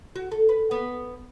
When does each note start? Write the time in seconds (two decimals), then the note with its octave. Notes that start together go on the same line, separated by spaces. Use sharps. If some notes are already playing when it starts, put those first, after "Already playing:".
0.16 F#4
0.31 A4
0.49 B4
0.71 B3